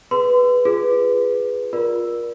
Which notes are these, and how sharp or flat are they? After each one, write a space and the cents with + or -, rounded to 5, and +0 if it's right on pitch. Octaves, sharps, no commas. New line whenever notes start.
G#4 +0 B4 +0 C6 -35
F4 +0 G#4 +0 B4 +0
F4 +15 A#4 +25 D5 +0